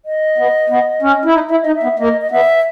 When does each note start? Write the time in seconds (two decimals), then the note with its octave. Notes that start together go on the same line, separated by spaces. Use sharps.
0.05 D#5
0.38 B3
0.70 B3
1.02 C#4
1.25 E4
1.34 D#4
1.48 E4 E5
1.62 D#4 D#5
1.75 E5
1.83 B3
1.99 A#3 D#5
2.21 D#5
2.31 B3 E5